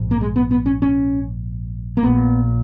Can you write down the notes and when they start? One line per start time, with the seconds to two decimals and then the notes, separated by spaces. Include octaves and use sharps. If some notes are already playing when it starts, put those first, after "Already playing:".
Already playing: A#1 G#2
0.11 A#3
0.21 G#3
0.36 B3
0.51 B3
0.66 C#4
0.82 C#4
1.97 A#3
2.03 A#1 A#2 B3